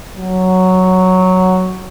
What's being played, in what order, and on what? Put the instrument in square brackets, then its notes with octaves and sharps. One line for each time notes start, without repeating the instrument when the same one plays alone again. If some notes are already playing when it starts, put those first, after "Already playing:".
[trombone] F#3